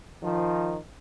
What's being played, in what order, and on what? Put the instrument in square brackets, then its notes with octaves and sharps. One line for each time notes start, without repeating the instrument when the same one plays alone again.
[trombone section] D#3 F3